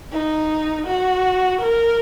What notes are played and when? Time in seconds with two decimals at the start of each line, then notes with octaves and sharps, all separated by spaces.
0.12 D#4
0.87 F#4
1.61 A#4